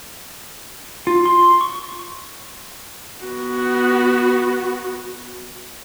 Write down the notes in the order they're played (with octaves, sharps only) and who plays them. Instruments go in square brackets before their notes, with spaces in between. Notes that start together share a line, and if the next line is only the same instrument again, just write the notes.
[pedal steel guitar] F4
C6
C#6
[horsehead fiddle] B3 F#4